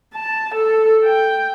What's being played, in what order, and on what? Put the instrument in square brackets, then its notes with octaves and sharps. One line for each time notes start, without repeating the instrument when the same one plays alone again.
[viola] A5
A4
G5